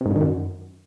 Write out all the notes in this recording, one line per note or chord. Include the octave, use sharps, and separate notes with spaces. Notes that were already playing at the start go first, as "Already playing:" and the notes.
C3
G#2
G2
D#3
F#2